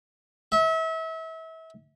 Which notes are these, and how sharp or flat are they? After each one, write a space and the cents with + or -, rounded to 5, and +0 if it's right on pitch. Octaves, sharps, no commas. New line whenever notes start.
E5 -35